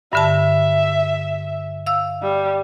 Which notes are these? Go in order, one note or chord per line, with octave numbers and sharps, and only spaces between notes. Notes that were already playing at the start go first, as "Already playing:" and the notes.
G2 D3 E5 A5
F5 E6
G3